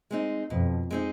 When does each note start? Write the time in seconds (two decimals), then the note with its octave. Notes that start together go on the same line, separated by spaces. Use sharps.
0.11 G#3 C4 D#4
0.50 F2 B2
0.91 G#3 C4 D#4